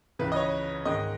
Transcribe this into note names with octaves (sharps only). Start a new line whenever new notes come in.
C#2 C#3 E3 B4
D#5
C#5
G#2 D#3 G#3 D#5